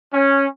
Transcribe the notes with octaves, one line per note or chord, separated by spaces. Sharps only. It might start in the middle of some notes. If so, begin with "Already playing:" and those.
C#4